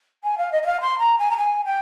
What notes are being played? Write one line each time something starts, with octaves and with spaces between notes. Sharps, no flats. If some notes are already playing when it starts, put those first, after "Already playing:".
G#5
F5
D#5
D#5
F5
C6
A#5
G#5
A#5
G#5
G5